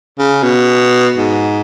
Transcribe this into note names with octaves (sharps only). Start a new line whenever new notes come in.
C#3
B2
G#2